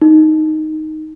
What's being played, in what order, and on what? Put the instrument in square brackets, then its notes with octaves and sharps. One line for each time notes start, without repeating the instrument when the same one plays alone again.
[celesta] D#4